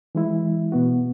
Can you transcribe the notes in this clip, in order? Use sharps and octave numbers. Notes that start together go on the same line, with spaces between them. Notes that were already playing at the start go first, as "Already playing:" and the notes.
E3 G#3 E4
B2 B3 F#4